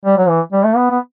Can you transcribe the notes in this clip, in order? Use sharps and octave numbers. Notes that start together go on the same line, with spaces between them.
G3
F#3
E3
G3
A3
B3
B3